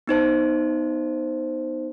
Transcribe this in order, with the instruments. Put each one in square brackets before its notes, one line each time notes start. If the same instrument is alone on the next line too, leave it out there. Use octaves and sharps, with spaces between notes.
[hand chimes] B3 D#4 C5 A5